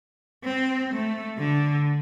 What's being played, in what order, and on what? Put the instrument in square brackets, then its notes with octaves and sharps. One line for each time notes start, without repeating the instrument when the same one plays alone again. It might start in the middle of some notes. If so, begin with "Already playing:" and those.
[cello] C4
A3
D3